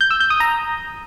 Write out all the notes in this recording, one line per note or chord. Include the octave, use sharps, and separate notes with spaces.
G6
E6
G6
D#6
A#5